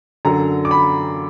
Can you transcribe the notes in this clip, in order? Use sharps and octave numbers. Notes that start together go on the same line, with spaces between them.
F#2 D3 F#3 A#5
D6
B5